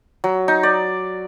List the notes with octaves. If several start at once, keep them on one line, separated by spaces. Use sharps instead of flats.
F#3
D#4
D5